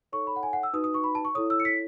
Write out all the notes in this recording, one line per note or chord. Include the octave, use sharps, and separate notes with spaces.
D#4 A4 C#5 C#6
B5
F#5
G#5
F#5
E6
D#4 F#4 B4 D#6
D#6
C#6
B5
A5
C#6
E4 A4 C#5 D#6
E6
C#7
B6